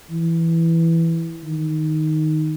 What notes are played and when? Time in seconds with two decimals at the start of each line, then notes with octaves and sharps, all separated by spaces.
0.11 E3
1.44 D#3